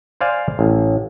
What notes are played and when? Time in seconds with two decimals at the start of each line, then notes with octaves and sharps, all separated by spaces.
0.21 C5 D5 F5 G#5
0.59 A1